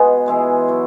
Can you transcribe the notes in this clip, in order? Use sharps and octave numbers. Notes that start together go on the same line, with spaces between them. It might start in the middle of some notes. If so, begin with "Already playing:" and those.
Already playing: B2 G#3 B3 G#4
E3 G#3 E4 G#4
F#3 E4